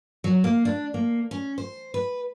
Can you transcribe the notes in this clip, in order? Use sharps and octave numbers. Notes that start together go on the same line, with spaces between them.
F#3
A#3
D4
A#3
C#4
C5
B4